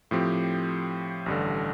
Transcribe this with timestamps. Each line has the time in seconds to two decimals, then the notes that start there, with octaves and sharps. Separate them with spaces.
0.11 A2 F3 C4 G4
1.26 A1 G2 D3